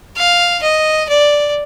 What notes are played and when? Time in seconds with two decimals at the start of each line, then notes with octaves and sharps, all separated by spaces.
0.16 F5
0.62 D#5
1.09 D5